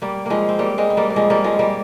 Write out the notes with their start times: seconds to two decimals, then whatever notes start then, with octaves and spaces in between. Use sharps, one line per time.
0.02 G3 A#3
0.26 F3 G#3 A#3
0.49 C4
0.59 G3 A#3
0.78 G#3 C4
0.90 C4
0.97 G3 A#3
1.10 A#3
1.16 F3 G#3
1.30 G3 A#3
1.44 F3 G#3
1.59 G3 A#3